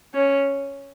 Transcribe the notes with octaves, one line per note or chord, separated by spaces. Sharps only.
C#4